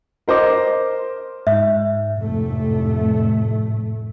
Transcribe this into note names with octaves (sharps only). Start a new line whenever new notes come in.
A#4 C5 D#5 D6
G#2 E5
F1 A2 A3